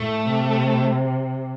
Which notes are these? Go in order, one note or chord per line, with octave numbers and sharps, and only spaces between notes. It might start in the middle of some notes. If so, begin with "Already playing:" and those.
Already playing: A2 A3
C3